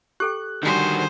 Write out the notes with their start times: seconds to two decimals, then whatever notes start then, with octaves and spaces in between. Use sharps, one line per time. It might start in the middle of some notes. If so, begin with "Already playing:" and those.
0.20 G4 A4 G5 F#6
0.63 D3 D#3 G3 F#4 G#4 C5